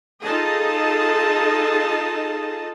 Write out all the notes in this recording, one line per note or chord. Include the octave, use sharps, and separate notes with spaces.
D#4 F4 G#4 A4 D#5 A5